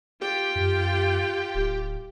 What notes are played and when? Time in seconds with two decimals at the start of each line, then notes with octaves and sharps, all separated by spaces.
0.22 F4 G4 G5
0.55 F#2
1.54 D1